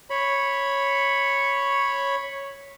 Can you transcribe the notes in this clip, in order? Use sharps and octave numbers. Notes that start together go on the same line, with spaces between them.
C#5 B5